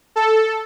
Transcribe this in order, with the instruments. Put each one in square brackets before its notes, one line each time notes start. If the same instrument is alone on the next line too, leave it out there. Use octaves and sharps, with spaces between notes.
[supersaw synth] A4